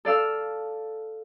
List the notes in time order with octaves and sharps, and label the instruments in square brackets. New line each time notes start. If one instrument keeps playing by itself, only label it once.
[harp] A4 D5 F5 E6